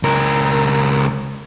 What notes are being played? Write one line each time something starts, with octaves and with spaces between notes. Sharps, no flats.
C#2 A#4